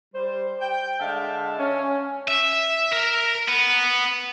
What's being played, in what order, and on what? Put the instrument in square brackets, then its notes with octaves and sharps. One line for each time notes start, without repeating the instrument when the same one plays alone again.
[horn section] G3 C5
G5
D3 G#3 E5 F5 A5
C#4
[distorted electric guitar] E5
A#4 A#5
B3